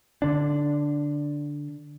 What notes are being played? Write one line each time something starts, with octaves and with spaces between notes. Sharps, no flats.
D3 D4